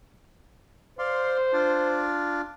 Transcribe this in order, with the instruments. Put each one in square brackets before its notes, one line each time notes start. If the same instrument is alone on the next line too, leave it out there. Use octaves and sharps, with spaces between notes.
[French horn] C5 [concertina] D5 F5 C6
[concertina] D4 F4 D5